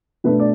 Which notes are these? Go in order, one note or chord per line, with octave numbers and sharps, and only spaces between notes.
B2 A3 D4 B4
D5